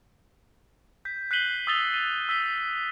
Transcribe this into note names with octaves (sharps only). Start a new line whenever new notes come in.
G6 B6
F#6 B6 C7 D#7 F#7 G7
D#6 E6 A6 F7 G7
D#7
E6 B6 G7